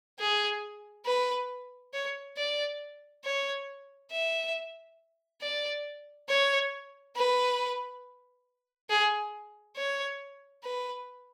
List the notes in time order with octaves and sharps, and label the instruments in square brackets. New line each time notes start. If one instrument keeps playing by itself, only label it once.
[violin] G#4
B4
C#5
D5
C#5
E5
D5
C#5
B4
G#4
C#5
B4